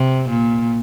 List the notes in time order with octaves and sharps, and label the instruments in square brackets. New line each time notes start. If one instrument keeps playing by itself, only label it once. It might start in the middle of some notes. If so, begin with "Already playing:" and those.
Already playing: [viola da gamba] C3
A#2